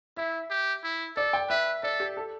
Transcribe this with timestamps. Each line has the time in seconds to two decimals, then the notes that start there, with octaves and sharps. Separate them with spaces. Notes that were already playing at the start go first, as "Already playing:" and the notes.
0.17 E4 E5
0.50 G4
0.83 E4
1.16 A4 D5
1.33 G5
1.49 B4 E5
1.83 A4 D5
2.00 G4
2.17 A4